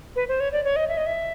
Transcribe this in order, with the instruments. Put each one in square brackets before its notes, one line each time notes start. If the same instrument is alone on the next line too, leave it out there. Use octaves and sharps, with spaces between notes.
[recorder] B4
C5
C#5
D5
C#5
D#5
E5
D#5
E5